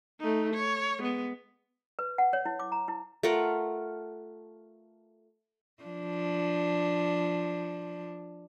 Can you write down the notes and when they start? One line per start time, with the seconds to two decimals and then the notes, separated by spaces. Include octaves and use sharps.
0.20 A3 D#4
0.54 C#5
1.00 G#3 B3
1.99 B4
2.18 F#5
2.33 C#5
2.46 E4
2.59 D6
2.72 A#5
2.88 E4
3.23 A3 F4 A#4 F#5
5.83 F3 D4